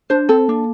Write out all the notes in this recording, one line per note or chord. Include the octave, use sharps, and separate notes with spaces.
D4 C5
C4 A4
A#3 D4